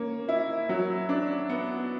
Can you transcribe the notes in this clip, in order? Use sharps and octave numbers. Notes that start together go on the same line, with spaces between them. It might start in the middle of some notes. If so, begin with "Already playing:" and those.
Already playing: A#3 C#4
E4
F#3
D4
B3